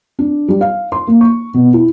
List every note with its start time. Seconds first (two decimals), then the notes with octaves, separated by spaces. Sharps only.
0.19 D4
0.48 G3
0.61 F5
0.92 C6
1.07 A#3
1.21 C#6
1.54 B2
1.73 E4